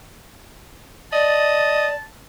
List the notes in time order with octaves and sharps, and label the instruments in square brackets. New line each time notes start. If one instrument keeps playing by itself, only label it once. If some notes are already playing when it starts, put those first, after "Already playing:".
[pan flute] D5 [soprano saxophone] D#5 [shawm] A5